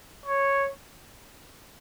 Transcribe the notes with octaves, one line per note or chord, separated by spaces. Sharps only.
C#5